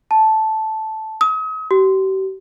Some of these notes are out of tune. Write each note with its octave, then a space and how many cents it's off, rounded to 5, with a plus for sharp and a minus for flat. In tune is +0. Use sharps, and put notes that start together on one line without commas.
A5 -5
D#6 +40
G4 -40